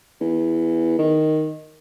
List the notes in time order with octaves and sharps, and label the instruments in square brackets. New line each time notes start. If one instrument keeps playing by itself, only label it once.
[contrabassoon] E2
D#3